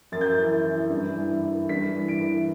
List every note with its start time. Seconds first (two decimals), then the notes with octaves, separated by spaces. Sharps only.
0.12 F#2 A6
0.21 G6
0.30 A6
0.38 E3
0.64 E3
0.90 G2
1.17 E3
1.43 E3
1.69 G2 B6
1.95 E3
2.08 D7
2.22 E3